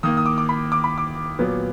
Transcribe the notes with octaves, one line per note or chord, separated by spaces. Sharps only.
D#3 A#3 D#6
D#6
D6
D6
B5
D6
B5
D6
A#2 F#3 B3